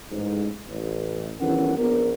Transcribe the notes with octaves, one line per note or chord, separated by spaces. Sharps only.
A1 G#2
A1
G1 D#3 E3 C#4 A#4 F#5
A#1 B3 A#4